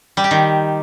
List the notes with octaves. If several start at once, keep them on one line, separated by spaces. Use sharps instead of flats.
G3
G4
D#3